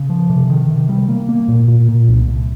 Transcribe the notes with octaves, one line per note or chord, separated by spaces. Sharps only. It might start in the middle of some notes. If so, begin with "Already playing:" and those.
Already playing: C#3
F3
C3
D#3
C3
G3
A#3
A#3
A#2
A#2
A#2
C2
C2